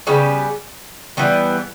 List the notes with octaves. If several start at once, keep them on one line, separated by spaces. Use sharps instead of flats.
C#3 G3 B3
E3 G3 B3